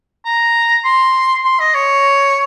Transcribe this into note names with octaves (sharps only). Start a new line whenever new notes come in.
A#5
C6
C6
D#5
C#5